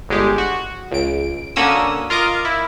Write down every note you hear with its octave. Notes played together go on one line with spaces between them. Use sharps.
G1 G#3 G4
F#4
C#2 D7
D3 A#3 C#4 F#4 D#6 E6
F4 A#4 D#5 A#5 D6
E4